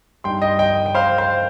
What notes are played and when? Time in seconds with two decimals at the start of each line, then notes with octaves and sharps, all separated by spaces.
0.24 G2 G3 D#4 G5 C6
0.42 D#5 G5
0.59 D#5 G5
0.86 G5
0.95 C5 F5
1.18 C5 F5